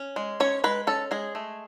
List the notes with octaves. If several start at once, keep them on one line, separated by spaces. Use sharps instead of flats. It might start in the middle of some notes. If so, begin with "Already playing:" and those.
Already playing: C#4
G#3
C#4 C#5
G#3 B4
C#4 A4
G#3 G#4
A3